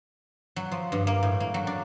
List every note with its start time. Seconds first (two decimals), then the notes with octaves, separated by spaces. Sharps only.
0.56 F#3
0.72 F3
0.92 G2
1.07 A#3
1.23 A2
1.40 A#3
1.54 F#3
1.67 D4